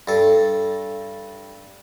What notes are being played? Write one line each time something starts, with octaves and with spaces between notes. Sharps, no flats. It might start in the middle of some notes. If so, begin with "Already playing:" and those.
G2 A4